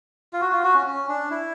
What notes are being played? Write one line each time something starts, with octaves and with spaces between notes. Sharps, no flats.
F4
F#4
F4
F#4
C#4
C#4
D4
E4